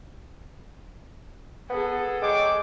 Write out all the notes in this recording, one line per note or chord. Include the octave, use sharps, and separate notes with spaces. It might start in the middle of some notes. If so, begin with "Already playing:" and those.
B3 G#4 A4
G#3 C#5 G5 D6